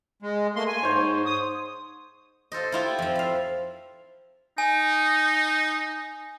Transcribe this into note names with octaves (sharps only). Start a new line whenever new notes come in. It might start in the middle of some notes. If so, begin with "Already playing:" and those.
G#3
A3 A#3 C6
G#5
G#2 C5 C#5
D#6
F4 A4 C5 D#5
E4 F4 G4
F2 F3
E5 F5
D#4 G#5